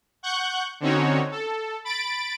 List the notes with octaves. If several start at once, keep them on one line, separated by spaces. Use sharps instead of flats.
F#5 C#6 F#6 G6
D3 C4 C#4 D#4 F#4 C#5
A4
B5 A6 D7